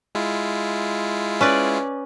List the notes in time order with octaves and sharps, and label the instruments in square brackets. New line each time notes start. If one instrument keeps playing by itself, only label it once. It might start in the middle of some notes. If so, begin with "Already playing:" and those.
[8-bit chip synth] G#3 E4 F4
[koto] C#4 B4 D5